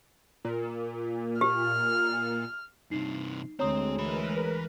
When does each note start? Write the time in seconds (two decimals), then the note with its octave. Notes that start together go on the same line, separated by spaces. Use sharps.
0.45 A#2
1.41 G4 F6
2.91 G2 C3 D#4 C7
3.59 D2 G#3 C4 C#5 A#5 D#6
3.98 E3 A#4 B4 B5